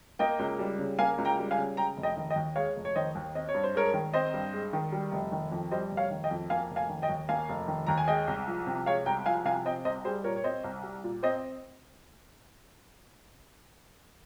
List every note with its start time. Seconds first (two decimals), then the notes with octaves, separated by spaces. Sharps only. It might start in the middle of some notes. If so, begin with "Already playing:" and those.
0.19 A#3 D#5 G5
0.39 C#2
0.59 G3
0.78 C#3
0.99 A#3 F5 G#5
1.18 C#2
1.25 G5 A#5
1.38 G3
1.51 F5 G#5
1.58 C#3
1.77 G#3 G5 A#5
1.97 F1
2.03 D#5 G5
2.17 D#3
2.30 D#5 G5
2.36 D#2
2.56 G#3 C#5 F5
2.76 F1
2.85 C#5
2.95 D#3 C5 D#5
3.15 D#2
3.35 C4 D#5
3.49 C#5
3.54 G2
3.63 C5
3.75 G#3 A#4 C#5
3.94 D#3
4.14 C4 C5 D#5
4.34 G2
4.53 G#3
4.73 D#3
4.92 G3
5.12 F1
5.32 D#3
5.52 F2
5.71 G3 C5 D#5
5.91 F1
5.97 C#5 F5
6.11 D#3
6.24 D#5 G5
6.31 F2
6.50 A#3 F5 G#5
6.70 F1
6.76 F5 G#5
6.89 D#3
7.02 D#5 G5
7.09 D#2
7.29 A#3 F5 G#5
7.49 F1
7.68 D#3
7.87 D#2 A#5
7.98 G#5
8.08 G#3 D#5 G5
8.28 C2
8.47 F3
8.67 C3
8.86 G#3 C#5 F5
9.06 C2 G5 A#5
9.26 F3 F5 G#5
9.45 C3 F5 G#5
9.65 C4 D#5 G5
9.85 C2 C5 D#5
10.05 G3 G#4 C5
10.24 A#2 A#4 C#5
10.36 C#5
10.44 C4 C5 D#5
10.64 C2
10.83 G3
11.04 A#2
11.23 C4 C5 D#5